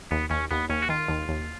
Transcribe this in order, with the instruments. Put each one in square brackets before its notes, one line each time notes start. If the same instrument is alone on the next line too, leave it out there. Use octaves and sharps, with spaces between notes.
[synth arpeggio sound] D#2 [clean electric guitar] B3
[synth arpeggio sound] D#2 [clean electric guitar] C#4
[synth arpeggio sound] D#2 [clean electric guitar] B3
[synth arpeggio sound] D#2 [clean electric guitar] C#4
[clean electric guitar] F#4
[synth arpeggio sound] D#3 [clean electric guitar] F4
[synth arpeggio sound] D#2
D#2